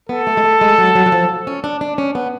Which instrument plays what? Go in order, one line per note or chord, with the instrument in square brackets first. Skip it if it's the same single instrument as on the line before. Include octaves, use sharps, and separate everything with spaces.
[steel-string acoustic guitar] B3 [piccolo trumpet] A4
[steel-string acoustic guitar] A3
G#3
A3
G#3
F#3
F#3
F#3
F3
C#4
D4
D4
C#4
B3